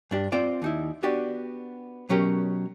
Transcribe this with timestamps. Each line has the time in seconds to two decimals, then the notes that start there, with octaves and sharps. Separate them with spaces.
0.11 G2 D4 G4
0.32 C4 F4 C5 D5
0.62 D#2 D#4 E4
1.03 B3 D4 F#4 G4 D5
2.09 B2 F#3 C#4 G4 A#4